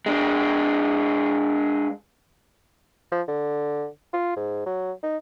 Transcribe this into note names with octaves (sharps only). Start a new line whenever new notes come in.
G#3 D4
F3
D3
F4
G#2
F#3
D#4